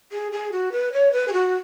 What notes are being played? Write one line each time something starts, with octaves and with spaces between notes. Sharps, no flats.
G#4
G#4
F#4
B4
C#5
B4
G#4
F#4